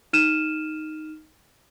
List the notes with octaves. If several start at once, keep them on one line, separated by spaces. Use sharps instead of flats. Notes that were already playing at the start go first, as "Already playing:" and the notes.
D#4 F6 D#7 E7